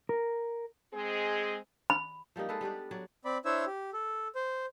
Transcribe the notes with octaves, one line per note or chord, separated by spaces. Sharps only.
A#4
G#3 C4 G#4
B5
F3 G3 A#3 D#4
G#3 A4 B4
G3 B3 D4 D5
F#3 D5
C4 D5 B5
D4 E4 C5 C#5 E5 E6
G4
A4
C5